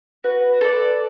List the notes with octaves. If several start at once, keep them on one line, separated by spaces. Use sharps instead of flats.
F#4 B4
A4 D5